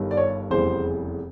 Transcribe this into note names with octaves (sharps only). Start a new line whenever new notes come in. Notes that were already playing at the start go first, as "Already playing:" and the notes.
Already playing: G1 G2 D#3 G3
D5
C#5
F1 E2 C#3 E3 G3 C5